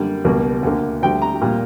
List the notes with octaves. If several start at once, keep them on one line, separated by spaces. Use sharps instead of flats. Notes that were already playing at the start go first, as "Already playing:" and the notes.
Already playing: F#2 D3 G3 A#3
C#2 B2 G3 A#3
D2 D3 A#3
D2 D3 G3 G5
A#5
A#2 G3 A#3